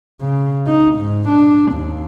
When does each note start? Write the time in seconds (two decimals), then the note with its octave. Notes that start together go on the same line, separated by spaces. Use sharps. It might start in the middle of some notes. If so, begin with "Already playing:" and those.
0.21 C#3
0.67 D#4
0.96 G#2
1.29 D4
1.73 D#2